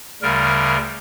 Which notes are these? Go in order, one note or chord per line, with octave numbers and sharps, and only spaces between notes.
D2 C#3 G3 A#4